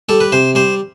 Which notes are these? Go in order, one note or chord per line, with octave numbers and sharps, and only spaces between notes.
G3 A4
B4
C3 C5
G3 C5